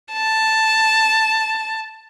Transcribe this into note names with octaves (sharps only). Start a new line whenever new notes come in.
A5